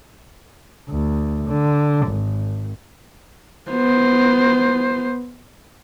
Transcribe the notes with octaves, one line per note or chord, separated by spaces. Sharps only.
D2
D3
G#1
B3 C5